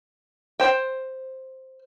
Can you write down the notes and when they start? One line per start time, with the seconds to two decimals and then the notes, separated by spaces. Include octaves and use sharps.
0.60 C5 G5